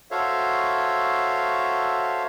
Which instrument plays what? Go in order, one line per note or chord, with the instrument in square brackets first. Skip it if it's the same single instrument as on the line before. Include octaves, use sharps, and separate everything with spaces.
[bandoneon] F#4 A4 C5 C#5 E5 F5